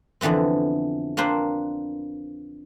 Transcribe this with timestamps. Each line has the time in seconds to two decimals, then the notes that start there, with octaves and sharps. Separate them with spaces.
0.21 F2 D3 E3 B3 C4
1.17 A#3 C4 D4 B4 C5